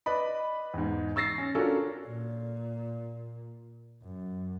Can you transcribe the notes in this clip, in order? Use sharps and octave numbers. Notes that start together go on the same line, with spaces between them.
B4 D5 D#5 B5
E2 G#2
C#6 E6 A6 A#6 C7
C#4
C#4 D4 F4 F#4 A4 A#4
A#2
F#2